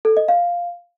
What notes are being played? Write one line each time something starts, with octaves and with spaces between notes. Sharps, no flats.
A4
D#5
F5